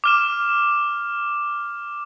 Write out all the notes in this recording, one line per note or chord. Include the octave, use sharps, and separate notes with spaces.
D6 F6 E7